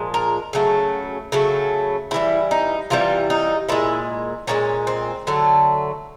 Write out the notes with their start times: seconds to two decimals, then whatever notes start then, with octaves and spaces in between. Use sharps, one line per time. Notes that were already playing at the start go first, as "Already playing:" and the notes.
Already playing: A#2 F3 G#3
0.14 A#4
0.53 C#3 F#3 A3
1.32 C#3 F#3 A3
2.11 C3 E3 G3 E4
2.51 D#4
2.90 C3 E3 G3 F4
3.30 D#4
3.69 A#2 F3 G#3 E4
4.47 A#2 F3 G#3 C#4
4.87 C4
5.27 D3 F#3 A3